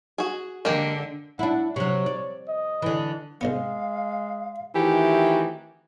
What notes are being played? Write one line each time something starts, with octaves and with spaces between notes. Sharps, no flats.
F#4 G#4
D3 G#3 A#3 G4
D4 E4 F#5
C3 F#3 C#5
D5
D#5
D3 E3
C2 G#2 G#3 B3 F5
D#3 E3 A3 C4 F#4 G4